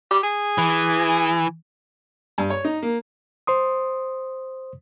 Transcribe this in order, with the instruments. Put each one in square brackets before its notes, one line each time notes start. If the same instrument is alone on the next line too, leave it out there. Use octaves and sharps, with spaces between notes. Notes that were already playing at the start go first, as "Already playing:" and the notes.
[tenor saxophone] G4
G#4
[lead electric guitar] E3
[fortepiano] G2
C#5
D#4
A#3
[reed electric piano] C5 C6 D#6